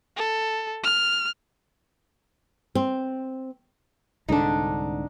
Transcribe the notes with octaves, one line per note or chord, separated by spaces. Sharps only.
A4
F6
C4
C2 G#2 D3 D4 D#4